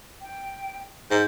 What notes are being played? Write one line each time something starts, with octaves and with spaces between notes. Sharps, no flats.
G5
G#2 G6